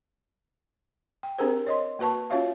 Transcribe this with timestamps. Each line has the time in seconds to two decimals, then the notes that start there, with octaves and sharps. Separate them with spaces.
1.23 G5
1.38 C4 D4 G4 G#4 A#4 C5
1.67 C#5 D#5 C6
1.99 A#3 F#4 B4 A5 C#6
2.30 C#4 F4 F#4 C#5 E5 F5